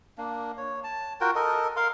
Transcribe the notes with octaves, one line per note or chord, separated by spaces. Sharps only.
A#3 D4
C#5
A5
F4 F#4 A#4 G5
A4 A#4 D#5
A#4 F5 C6